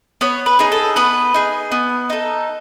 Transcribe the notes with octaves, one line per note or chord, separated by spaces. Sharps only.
B3 C#5
B4
D#4 G#4
A4
B3 B4
D#4 G#4
B3
D#4 A4